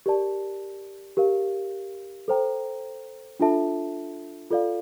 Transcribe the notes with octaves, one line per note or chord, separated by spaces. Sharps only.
G4 A#4 D5 A5
G4 A#4 F5
A4 C5 G5 A#5
D4 F4 A4 E5 A5
F4 A4 D5 F5